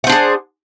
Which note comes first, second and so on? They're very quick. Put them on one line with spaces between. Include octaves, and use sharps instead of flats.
F#5 C5 D4 G#4